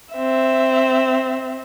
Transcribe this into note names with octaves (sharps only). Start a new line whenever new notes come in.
C4 E5